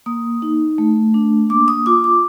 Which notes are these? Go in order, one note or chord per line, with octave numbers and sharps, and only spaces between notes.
A#3 D#6
D#4
A3
D4
A#3 D6
D#6
F4 D6
D6